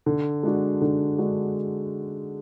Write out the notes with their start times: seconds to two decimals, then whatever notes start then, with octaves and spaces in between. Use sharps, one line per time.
0.06 D3
0.43 G#3 D4 F#4
0.81 D3
1.18 G#3 D4 F#4